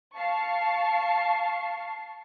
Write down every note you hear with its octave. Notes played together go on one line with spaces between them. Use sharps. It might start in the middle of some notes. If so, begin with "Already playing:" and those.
F5 A5 C#6 C7